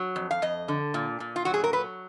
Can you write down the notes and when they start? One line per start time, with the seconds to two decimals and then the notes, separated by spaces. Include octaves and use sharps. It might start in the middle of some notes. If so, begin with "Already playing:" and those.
Already playing: F#3
0.16 F2
0.31 F5
0.42 F2 D#5
0.68 D3
0.94 A#2
1.20 A#2
1.36 F4
1.45 F#3 F#4
1.54 G#4
1.64 A#4
1.73 F#3 B4